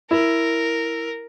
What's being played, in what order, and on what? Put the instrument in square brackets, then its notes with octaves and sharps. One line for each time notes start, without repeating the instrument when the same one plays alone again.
[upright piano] E4 [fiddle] A#4